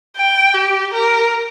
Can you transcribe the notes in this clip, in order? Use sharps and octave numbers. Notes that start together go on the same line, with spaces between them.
G5
G4
A#4